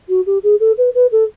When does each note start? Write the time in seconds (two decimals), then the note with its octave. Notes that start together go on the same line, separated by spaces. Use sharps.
0.09 F#4
0.26 G4
0.43 G#4
0.60 A4
0.78 B4
0.95 B4
1.12 A4